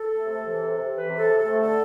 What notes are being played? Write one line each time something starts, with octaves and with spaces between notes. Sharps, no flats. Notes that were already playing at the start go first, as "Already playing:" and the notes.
Already playing: A4
A3
C3
E3
C3
C3
E3 B4
C3
A4
C3
A4
A3
D3 A4